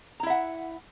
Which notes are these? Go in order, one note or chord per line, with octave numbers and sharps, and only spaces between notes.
E4 E5 F#5 A#5